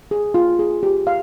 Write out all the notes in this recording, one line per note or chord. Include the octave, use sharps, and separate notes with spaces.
G#4
F4
G#4
G4
F5